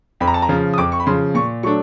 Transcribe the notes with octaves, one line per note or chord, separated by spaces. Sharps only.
F2 B5
A#5
A5
A#5
C#3 F3
D#6
F2 D6
C#6
B5
C#3 F3 C6
A#2 C#6
F#3 A3 D4 C#6